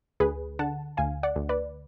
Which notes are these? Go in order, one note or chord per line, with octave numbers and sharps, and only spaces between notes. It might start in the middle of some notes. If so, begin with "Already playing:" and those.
D2 G#4 B4
D3 F#5 A5
D2 F5 G#5
D5 F#5
D2
B4 D5